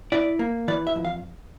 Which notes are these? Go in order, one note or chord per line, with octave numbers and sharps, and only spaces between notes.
E4 D5
A#3
E3 D5
E5
F2
F5